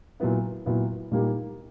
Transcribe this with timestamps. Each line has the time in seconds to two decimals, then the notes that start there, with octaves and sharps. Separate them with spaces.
0.20 A#2 F#3 B3 E4
0.66 A#2 F#3 B3 E4
1.11 A#2 G3 A#3 D#4 G4